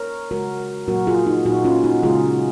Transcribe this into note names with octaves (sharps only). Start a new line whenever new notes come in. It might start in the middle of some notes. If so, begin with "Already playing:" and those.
Already playing: A#4 C#5
C#3 G#3 F#4 A#4
A#2 F#3 A#3 F#4 A#4
F4 G#4
D#4 F#4
A#2 F#3 A#3 D#4 F#4
C#4 F4
D#4 F#4
C#3 G#3 F4 G#4